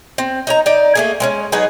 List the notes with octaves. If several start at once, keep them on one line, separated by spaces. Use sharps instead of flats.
C4
D#4 C#5 A#5
D#4 D5
A3 A#3 G#4
G#3 B3 C#4
F#3 D#4 G#4 B4